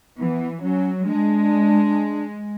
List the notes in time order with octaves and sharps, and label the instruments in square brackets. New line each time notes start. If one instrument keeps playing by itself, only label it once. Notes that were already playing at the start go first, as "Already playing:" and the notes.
[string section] E3 [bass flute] B3
[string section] F#3 [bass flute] C#4
[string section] G#3 [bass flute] D4